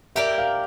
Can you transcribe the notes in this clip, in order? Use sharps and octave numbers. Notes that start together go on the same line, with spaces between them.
G4 A#4 D5 E5
F5